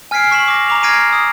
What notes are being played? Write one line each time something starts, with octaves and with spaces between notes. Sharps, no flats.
G#5 F6 G#6 B6 C7 D7
C#6 B6 E7 F#7
D6 A#6
A#5 D6 F7
F6 G#6 A#6 C7 D7 D#7
D#6